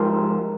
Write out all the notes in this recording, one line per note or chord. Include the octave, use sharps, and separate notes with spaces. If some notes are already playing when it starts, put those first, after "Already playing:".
Already playing: G#2 F3 G4 A#4